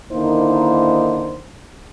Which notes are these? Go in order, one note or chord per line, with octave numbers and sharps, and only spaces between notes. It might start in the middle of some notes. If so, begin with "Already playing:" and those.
D3 D#3 A#3 D#4 E4 C5